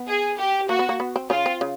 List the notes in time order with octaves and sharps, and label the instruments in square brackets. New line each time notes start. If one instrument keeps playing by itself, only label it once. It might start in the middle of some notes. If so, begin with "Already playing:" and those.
Already playing: [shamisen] B3
[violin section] G#4
G4
[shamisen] A#3 [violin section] F#4
[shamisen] B3
A#3
B3
C4
[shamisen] C#3 C#4 [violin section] F4
[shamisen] C4
C#3